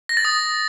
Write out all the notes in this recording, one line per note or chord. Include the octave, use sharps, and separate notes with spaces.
A#6
A6
D#6